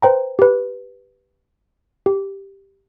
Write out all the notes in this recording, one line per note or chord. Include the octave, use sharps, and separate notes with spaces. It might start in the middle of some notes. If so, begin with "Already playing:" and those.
B4 C5 G5 A#5
G4 B4
G4